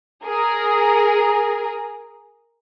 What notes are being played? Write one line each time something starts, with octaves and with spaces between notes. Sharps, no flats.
G#4 A#4